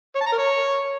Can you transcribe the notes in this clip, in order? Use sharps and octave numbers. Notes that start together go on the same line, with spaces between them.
C#5
A5
A#5
A#4
C#5